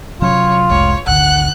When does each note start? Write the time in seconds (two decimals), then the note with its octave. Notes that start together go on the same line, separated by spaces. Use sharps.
0.22 C3 F#3 C#4 F4 C#5
0.70 F1 C2 G#3 C#5
1.07 G#1 D2 D3 F#5 F#6